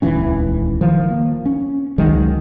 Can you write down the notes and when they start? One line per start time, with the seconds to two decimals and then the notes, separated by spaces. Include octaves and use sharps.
0.02 D#1 C#2 E3 C#4
0.81 D#3 F3
1.10 A#3
1.46 C#4
1.98 C#2 D#3 F#3 G#3